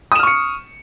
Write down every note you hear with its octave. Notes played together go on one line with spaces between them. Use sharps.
C#6 D#6 F6 C#7 E7